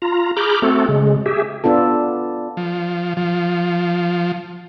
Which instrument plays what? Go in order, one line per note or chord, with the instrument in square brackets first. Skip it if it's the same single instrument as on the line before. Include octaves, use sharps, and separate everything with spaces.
[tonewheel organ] F4 A#5
G#4 A#5 B5 D6 F6 G6
A3 C4 F#4 A4
C#3 G#3
G4 G#4 E5
[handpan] B3 D4 F4 A4
[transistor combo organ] F3
F3